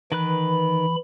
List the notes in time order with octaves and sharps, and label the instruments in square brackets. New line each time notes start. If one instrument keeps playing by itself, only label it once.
[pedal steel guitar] D#3 B4 F#6 [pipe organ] E3 B5